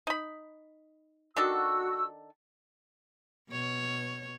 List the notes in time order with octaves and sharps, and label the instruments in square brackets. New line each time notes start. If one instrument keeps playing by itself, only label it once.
[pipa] D#4 B5
[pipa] D#3 D4 A4 [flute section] F#4 E6
[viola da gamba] B2 C#5